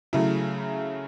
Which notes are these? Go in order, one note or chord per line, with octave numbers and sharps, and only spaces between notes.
C#3 F#3 A3 E4